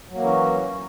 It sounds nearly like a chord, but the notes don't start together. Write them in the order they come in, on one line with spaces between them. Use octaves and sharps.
F#3 A#3 E3 C#4